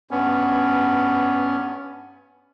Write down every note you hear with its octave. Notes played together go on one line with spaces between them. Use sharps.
G2 B3 C#4